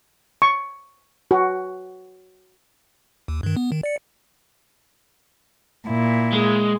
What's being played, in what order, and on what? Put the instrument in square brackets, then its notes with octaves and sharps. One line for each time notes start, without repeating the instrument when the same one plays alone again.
[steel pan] C#6
F#4
[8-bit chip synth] D#2
G2 D#3
B3
D#3
D5 C#7
[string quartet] A#2 E4
[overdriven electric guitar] G#3